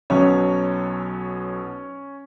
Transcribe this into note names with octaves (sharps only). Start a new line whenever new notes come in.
B1 B2 F#3 C#4 C#5